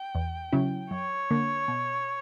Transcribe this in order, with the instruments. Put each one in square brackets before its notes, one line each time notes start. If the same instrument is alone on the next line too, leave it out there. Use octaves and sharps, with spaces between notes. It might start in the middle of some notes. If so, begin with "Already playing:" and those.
Already playing: [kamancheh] G5
[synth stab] E2
C#3 F#3 C#4 E4
[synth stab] F#2 [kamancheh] C#5
[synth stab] D3 A#3
B2